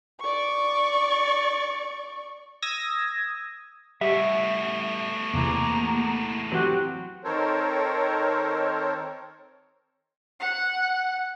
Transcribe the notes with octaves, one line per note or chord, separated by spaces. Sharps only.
D5 C#6
D#6 E6 G#6 A#6
A2 G3 B3 E5
E2 C3 E3 A#3 A#5
E3 F#3 C4 F#4 G4
D#3 C4 A4 A#4 C5 C#5
F#5